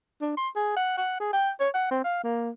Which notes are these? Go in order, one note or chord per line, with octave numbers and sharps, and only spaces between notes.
D4
C6
G#4
F#5
F#5
G#4
G5
C#5
F#5
C4
F5
A#3